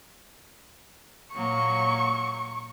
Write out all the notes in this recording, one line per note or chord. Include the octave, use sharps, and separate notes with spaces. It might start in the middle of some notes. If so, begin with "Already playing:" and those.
A#2 F#3 A#3 C#6